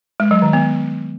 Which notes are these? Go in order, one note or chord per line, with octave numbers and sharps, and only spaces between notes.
G#3
F#3
D#3
B3